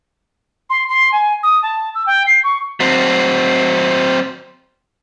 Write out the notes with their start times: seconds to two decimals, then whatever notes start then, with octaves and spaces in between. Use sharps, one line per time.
0.69 C6
0.88 C6
1.12 G#5
1.43 D#6
1.62 A5
1.94 E6
2.06 G5
2.26 C7
2.43 C#6
2.80 F#3 C4